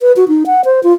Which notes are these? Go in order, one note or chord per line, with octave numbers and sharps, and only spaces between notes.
B4
F#4
D#4
F#5
C5
F4